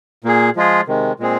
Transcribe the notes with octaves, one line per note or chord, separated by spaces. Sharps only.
A#2 A#3 G#4
F3 G#3 F4 G#4
C3 D#3 G#3
A#2 G#3 C4 G#4